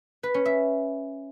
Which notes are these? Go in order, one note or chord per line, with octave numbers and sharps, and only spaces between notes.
B4
C#4
E5